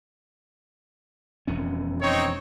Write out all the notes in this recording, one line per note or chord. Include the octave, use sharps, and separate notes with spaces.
E1 F2 C#4
C4 D#4 C#5